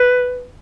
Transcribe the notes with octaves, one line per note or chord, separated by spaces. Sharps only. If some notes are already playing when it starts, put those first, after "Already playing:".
Already playing: B4